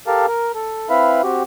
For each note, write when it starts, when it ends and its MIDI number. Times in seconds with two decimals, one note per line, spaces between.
0.07 0.26 67
0.07 0.26 69
0.07 0.26 70
0.07 0.26 77
0.07 0.26 81
0.27 0.52 70
0.55 0.88 69
0.90 1.22 60
0.90 1.22 64
0.90 1.22 71
0.90 1.22 76
0.90 1.22 77
0.90 1.22 83
1.23 1.43 60
1.23 1.43 66
1.23 1.43 67